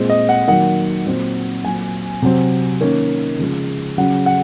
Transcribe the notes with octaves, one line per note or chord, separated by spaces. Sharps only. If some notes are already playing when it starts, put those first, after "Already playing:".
Already playing: A#2 G#3 C4
D#5
F#5
D#3 F#3 A#3 F#5
A#2 F#3 C4
A#2 F#3 C4 G#5
C3 F#3 C4
D#3 A#3 C#4
C#3 F3 G#3
C#3 F#3 C#4 F#5
F#5